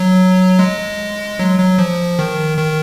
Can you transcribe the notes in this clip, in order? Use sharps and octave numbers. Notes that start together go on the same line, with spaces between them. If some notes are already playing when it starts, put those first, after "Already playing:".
Already playing: F#3
G#3
F#3
F#3
F3
D#3
D#3